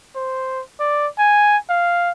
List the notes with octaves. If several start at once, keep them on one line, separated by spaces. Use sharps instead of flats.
C5
D5
G#5
F5